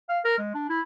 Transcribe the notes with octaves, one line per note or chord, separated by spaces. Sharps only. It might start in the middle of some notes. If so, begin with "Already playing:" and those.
F5
A#4
G#3
D4
E4